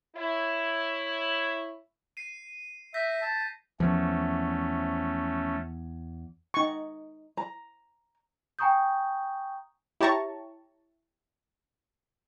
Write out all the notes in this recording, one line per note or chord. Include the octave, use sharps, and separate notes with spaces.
E4 C#5
C7 D#7
E5 G6 A#6 B6
A5
E2 F3 A3 C#4
D#4 C#6
A#5
G5 G#5 A#5 C#6 D#6 G6
E4 G4 C#5 A5 A#5 C#6